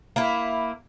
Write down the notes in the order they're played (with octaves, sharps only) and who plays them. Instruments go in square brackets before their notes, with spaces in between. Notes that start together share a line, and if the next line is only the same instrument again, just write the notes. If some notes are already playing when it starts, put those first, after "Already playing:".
[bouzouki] A#3 E4